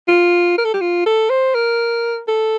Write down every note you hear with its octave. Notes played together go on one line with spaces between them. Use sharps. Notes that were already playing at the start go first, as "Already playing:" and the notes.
F4
A#4
A4
G4
F4
A4
C5
A#4
A4